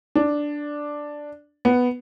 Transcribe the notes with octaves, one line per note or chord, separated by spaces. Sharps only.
D4
B3